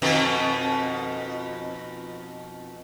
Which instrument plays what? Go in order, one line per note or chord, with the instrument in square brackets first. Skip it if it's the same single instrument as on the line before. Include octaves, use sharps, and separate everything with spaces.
[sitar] F2 B2 D#3